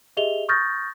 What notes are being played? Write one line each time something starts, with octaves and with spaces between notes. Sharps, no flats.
G4 G#4 D#5 E5 F7 G7
C#6 D#6 F6 G6 A6 A#6